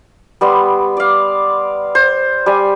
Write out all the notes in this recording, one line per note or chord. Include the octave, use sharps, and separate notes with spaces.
G3 B3 C6
D5 F5
C5
G3 G#5